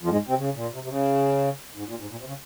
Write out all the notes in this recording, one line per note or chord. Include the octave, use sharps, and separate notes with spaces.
F2 F3
G#2 G#3
C3 C4
C#3
A#2
C3
C3
C#3
G#2
A#2
G#2
A#2
C3
C#3